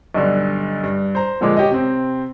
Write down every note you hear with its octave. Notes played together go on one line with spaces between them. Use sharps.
B1 G2 D3
G2
C5 A#5
A#2 D3 F3 G#3 D6
G4 C#5 D#5
C3 C4